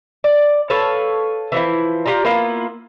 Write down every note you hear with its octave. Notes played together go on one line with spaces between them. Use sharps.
D5
A4 B4 C#5 F5
E3 F3 E4
F4 G4 D5 A#5
A#3 B3 E4 F4